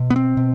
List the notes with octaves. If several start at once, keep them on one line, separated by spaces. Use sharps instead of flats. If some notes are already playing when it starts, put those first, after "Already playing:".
Already playing: B2
B3
C4
B2